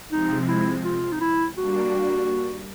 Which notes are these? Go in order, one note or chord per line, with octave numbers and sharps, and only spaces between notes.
C3 F3 G#3 C4 D#4
E4
F4
D#4
E4
G3 A#3 D4 F#4